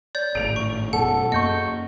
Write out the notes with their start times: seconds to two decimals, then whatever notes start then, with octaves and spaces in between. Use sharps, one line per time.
0.15 C#5 D5 G6
0.35 G#1 A2 D7 F7
0.56 C#6
0.93 F#2 B2 A4 F#5
1.32 F#2 A#3 D#5 C#6 G6 C#7